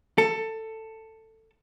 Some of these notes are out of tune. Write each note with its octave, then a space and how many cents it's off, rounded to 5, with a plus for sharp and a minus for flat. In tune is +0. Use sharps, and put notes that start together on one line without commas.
A4 +15